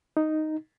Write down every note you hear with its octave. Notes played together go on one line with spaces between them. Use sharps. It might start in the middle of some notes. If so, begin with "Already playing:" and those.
D#4